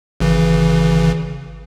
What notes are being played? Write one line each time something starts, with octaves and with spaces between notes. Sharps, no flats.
G#1 C#3 E3